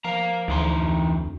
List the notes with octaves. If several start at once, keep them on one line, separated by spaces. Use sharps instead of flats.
F3 A#4 F5 A#5
D2 E3 D#4 C6
F2